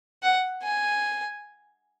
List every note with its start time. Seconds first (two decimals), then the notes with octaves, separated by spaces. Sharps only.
0.23 F#5
0.63 G#5